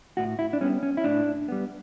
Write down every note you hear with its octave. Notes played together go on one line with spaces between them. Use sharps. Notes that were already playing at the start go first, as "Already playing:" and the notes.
A2 F#4
E4
D4
G3 B3 C#4
C#4
E4
A2 D4
G3 B3